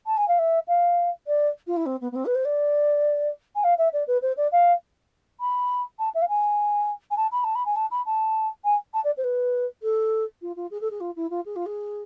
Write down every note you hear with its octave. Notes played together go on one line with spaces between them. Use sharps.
A5
G#5
F5
E5
F5
D5
F4
E4
C4
B3
B3
C4
B4
C5
D5
G#5
F5
E5
D5
B4
C5
D5
F5
B5
A5
E5
F5
G#5
G#5
A5
B5
A5
B5
G#5
A5
B5
A5
G#5
A5
D5
C5
B4
A4
F4
F4
G#4
A4
G#4
F4
E4
F4
G#4
F4
G#4